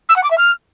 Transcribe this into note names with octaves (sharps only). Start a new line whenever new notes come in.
E6
F#5
D6
E5
F6